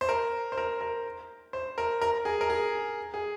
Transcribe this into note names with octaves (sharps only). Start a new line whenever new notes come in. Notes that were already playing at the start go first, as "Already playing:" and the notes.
C5
A#4
C5
A#4
A#4
C5
A#4
A#4
G#4
A#4
G#4
G#4